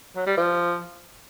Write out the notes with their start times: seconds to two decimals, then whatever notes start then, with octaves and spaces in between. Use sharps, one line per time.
0.16 F#3
0.26 G3
0.37 F3